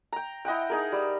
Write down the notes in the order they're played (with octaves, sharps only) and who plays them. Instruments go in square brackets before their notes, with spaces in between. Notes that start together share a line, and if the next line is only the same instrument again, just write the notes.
[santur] G5 A#5
E4 D#5 F#5 G5
D#4 G#4 A#4
G3